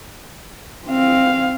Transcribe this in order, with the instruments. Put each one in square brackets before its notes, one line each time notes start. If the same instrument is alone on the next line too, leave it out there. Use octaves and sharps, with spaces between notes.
[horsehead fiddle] C4 F5